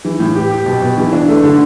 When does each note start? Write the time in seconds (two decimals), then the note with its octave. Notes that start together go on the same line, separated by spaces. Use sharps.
0.05 E3
0.20 A2
0.35 G4
0.51 G4
0.66 B2
0.82 B2
0.97 E3
1.13 D4
1.29 A3
1.43 D3